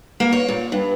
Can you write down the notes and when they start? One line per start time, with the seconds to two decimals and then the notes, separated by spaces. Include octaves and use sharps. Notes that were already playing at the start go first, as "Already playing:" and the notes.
0.20 A#3
0.33 C#5
0.48 A#2
0.72 G2